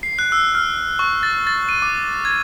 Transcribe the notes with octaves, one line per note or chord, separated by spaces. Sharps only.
C7
F#6
E6
F6
C#6
A6
A6
D#7
D6
G#6